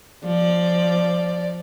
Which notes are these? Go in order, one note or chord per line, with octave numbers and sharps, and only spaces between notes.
F3 D5